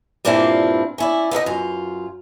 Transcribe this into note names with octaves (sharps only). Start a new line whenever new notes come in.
G2 A#2 C4 D4 E4 F4
C#4 E4 D5
B3 C4 A#4 D#5
F#2 F4